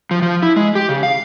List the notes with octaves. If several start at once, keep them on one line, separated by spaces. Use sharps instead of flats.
F3
F3
E4
G#3
G4
C#3
F5